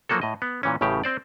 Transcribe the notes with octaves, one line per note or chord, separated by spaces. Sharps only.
F3 F#3 A#3 F#4 A4
A2 D#5
B3
A#2 E3 C#4
A1 A2 C#3 G4
C4 C5 D5